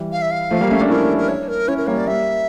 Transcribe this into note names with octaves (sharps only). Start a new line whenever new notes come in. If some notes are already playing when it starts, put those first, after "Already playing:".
Already playing: E3 G3
F5
E5
F5
F3 A3
G3 A#3
A3 C#4
A#3 D4
C#4 E4 A#4
A#4
C#5
A#4
C#4 E4 C#5
A#4
G3 A#3 C#5
D5
G3 A#3 E5